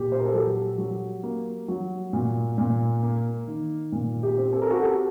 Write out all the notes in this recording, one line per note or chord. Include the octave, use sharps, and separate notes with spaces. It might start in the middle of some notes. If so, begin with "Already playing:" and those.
Already playing: A#2 G4
C5
A#4
A4
F#3 G4
F#3
A#3
F#3
A#2
A#2
A#3
D#3
A#2
G4
C4
A4
A#4
F#4 A4
C4 G4